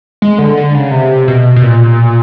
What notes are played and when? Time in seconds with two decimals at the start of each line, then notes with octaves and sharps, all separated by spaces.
0.22 G#3
0.38 D3
0.57 D3
0.75 C#3
0.91 C3
1.28 B2
1.56 B2
1.62 A#2